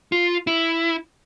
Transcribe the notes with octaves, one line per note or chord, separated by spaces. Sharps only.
F4
E4